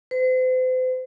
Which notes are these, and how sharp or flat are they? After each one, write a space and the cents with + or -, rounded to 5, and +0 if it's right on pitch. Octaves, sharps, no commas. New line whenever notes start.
C5 -40